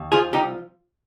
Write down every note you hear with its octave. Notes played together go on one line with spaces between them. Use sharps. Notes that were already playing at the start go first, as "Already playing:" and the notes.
Already playing: D#2
F3 F4 G#4
C2 D#4 G4